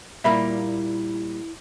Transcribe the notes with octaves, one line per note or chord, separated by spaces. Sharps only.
A#2 G3 A#3 E4 E5 B5